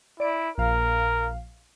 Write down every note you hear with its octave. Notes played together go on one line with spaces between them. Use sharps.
E4 D5 D7
A#1 A#4 F5